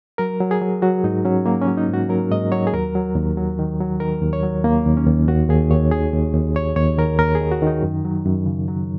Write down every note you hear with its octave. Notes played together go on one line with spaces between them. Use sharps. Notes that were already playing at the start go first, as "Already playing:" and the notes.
F#3 A#4
F#3
G#4
F#3
F#3 F#4
G#2 D#4
F#3 C#4
F#3 A#3
C#4
F#3
D#4
G#2
F#4
F#3 A#4
G#2 D#5
F#3 C#5
G#4
D#2 A#4
F#3
D#2
F#3
D#3
F#3
D#3 A#4
D#2
C#5
F#3
D#2 A#3
D#2
C#4
D#2
D#2 F#4
D#2 G#4
D#2 C#5
D#3 G#4
D#2
D#2
D#2 C#5
D#2 C#5
D#3 A#4
D#2 A#4
G#4
D#3
F#4
D#3 D#4
F#2
F#3
F#2
C#3
F#3